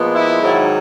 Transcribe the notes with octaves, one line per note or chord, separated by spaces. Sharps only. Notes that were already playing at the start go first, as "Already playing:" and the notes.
Already playing: A#2 F3 G#3 B3
E4
G#2 D#3 F#3